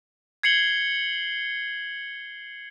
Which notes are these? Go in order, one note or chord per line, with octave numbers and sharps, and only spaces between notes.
G#6 C7 C#7 F#7 G7